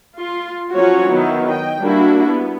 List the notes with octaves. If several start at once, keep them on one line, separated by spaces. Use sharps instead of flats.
F4 C6
F3 F#3 C#4 F4 F#4 C#5
D#3 F#3 B3 E4
D#5 G5
G3 A#3 D4 E4 F#4
B3